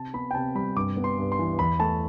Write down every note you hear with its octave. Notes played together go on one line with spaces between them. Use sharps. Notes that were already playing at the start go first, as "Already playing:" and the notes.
Already playing: C3 A5
B3 B5
G5
C3 A5
G3 B5
G2 D6
B3
C6
G2
C6
E3
E2 B5
A3 A5